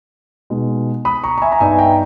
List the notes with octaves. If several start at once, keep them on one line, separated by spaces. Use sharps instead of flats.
B2 G#3 D#4
B5 D#6
A#5 C#6
A#5
E5 G#5
A#5
G2 G3 B3 D#4 E5 G#5
G5 A#5